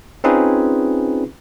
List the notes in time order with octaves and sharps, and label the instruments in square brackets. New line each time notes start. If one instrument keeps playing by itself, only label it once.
[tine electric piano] C4 C#4 D#4 F4 G#4 B4